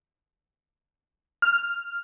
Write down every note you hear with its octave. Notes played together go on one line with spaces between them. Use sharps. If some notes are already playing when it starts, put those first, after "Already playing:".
F6